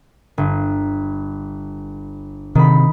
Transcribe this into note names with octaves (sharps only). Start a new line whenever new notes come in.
G1
C3 D#3 B5